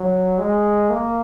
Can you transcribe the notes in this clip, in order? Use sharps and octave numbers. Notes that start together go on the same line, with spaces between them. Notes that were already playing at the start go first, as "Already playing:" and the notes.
Already playing: F#3
G#3
A#3